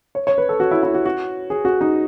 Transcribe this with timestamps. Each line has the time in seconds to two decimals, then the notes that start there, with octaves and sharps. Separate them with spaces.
0.15 C#5
0.27 C#5
0.38 B4
0.49 A4
0.60 F#4
0.71 E4
0.83 E4
0.94 F#4
1.06 F#4
1.50 G#4
1.65 F#4
1.81 D#4